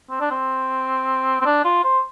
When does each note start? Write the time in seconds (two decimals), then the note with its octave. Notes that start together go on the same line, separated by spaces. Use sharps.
0.10 C4
0.20 D4
0.31 C4
1.41 C4
1.46 D4
1.65 F4
1.84 C5